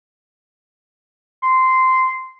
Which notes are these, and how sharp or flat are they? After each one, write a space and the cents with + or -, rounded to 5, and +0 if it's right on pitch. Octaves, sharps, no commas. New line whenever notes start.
C6 -10